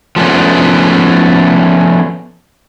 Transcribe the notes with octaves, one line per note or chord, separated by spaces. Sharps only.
F3 A3 B3 C#4 D4